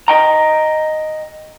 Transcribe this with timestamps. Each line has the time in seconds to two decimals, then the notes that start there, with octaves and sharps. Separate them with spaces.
0.08 D#5 G5 A#5